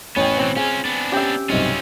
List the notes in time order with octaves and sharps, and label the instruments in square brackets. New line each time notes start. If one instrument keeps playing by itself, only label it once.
[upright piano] A1 G5 [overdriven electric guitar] B3 G#4 [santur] C#4
[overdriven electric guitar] B2 E3 [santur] C4
[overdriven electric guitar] C#4 F4 [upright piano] G#4 [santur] G#5
[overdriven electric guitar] B3 D4
[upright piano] C#4 [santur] G4 E5
[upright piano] B1 G2 C3 [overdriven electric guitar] C#4 F4